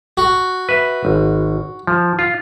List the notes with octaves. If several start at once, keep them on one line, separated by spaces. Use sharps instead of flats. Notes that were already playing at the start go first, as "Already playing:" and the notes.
F#4
B4 E5
G#1
F3
F4